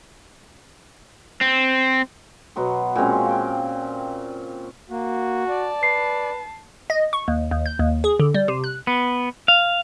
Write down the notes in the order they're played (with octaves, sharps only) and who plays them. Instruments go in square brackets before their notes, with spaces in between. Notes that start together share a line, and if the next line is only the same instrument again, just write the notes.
[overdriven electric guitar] C4
[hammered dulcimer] B2 F#3 B3 C6
A#2 G#3 C4 C#4
F5 G5
[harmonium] A#3 [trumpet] F#4
[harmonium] D5 [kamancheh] A5
[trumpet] B4 [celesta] C7
[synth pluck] D#5
C#6
D#2
D#2
G6
D#2
G#4
D3
G3
C3
F#6
[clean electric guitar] B3
F5